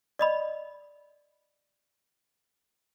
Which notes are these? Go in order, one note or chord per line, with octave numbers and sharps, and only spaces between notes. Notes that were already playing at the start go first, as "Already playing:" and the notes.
D5 D#5 B5